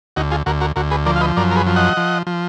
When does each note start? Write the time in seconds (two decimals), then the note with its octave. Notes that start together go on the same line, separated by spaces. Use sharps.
0.16 D2 D#4 F#4
0.31 F4 G#4
0.46 D2 F#4 A#4
0.61 F#4 A#4
0.76 D2 F#4 A#4
0.91 G#4 B4
1.06 F3 A#4 D5
1.16 F5
1.21 B4 D#5
1.37 F#2 A#4 D5
1.51 A#4
1.56 G#4 B4
1.67 F3
1.76 D#5 F#5
1.97 F3
2.27 F3